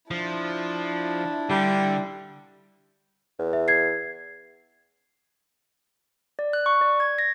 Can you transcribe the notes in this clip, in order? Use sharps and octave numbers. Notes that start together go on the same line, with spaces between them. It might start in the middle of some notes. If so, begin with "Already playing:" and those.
F3 D4 E4
D3 G3
E2
E5
G#6 C7
D5
F#6
C#6
D5
G#6
A#6